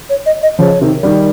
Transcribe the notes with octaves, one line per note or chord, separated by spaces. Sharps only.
C#5
D#5
D#5
C#3 F3 C#5
C3 D#3
D#3 G3